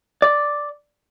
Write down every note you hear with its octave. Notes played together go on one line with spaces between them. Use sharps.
D5